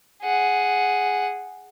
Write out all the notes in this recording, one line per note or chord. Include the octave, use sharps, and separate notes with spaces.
G#4 F#5